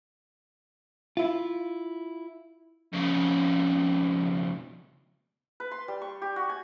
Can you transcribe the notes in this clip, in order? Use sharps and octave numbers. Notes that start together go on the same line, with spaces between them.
E4 F4
F2 C#3
B4
C6
G3
C#6
G4
F#4
G#5